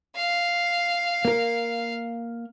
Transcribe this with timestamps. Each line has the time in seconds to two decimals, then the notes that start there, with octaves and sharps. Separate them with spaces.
0.16 F5
1.25 A#3 A#4